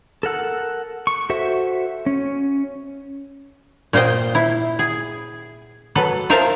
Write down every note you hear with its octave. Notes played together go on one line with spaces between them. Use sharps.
A4 A#4 F#5 E6
C#6
F#4 A4 C5 E5 F#5
C#4
A#2 F4 C5 D#5 G5
E4
G#4
F#3 A4 B4
F4 A#4 C5 E5 F5 A5